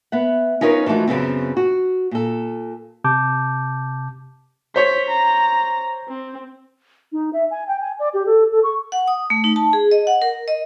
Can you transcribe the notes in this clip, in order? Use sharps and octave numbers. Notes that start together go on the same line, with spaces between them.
B3 E5 F#5
C#4 D#4 F4 A#4 B4 C#5
E3 F3 A3 D#4 F#4
F#2 C#3 B3 C4
F#4
A#2 A4
C3 A5 D6 G6
C5 C#5 B6
A#5
C4
D#4
E5
G#5
G5
G#5
D5
G4
A4
A4
C#6
F#5
D#6
A3
D#4
A5
G#4
D#5
F#5
A#4
D#5